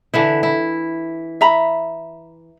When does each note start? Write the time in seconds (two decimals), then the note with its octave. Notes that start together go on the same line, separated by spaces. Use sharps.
0.14 D3 E3 E4
0.43 E4
1.41 E5 A#5 B5